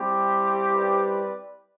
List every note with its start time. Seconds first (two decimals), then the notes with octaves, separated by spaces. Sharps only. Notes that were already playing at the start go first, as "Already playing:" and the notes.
Already playing: G3 C4 E4 G4
0.74 B4 D5